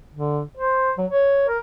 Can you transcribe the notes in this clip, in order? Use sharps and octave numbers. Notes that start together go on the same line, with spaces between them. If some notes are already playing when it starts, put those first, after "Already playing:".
D3
C5
F#3
C#5
A#4